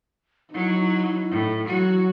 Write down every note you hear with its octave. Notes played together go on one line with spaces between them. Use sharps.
F#3 D#4 E4
A2
F#3 F#4